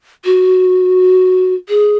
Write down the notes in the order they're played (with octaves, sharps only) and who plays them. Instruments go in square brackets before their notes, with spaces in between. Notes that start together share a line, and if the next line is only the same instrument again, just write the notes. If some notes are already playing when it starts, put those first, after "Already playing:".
[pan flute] F#4
G#4